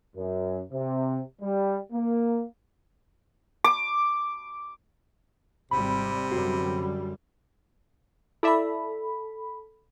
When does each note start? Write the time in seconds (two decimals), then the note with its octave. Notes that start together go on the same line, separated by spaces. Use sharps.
0.16 F#2
0.72 C3
1.42 G3
1.92 A#3
3.64 D6
5.71 G#1 C3 G3 B5
6.32 F#2 D3 G3 F#4
8.43 E4 A4 D5 E5 B5